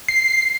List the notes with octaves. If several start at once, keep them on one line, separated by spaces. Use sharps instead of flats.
C7